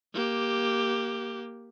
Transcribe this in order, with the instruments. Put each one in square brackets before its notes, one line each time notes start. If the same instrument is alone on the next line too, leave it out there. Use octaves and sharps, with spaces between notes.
[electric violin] A#3 G4